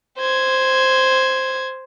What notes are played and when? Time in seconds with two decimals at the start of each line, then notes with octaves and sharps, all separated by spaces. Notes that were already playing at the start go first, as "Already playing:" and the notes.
0.18 C5 G#6